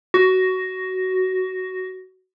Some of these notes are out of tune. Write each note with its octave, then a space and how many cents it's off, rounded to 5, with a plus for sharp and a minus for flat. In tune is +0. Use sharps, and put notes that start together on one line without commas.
F#4 +15